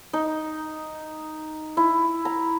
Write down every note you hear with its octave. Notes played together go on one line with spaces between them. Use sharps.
D#4
E4
A#5